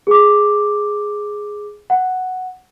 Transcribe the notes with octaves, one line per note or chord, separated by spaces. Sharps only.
G#4 D6
F#5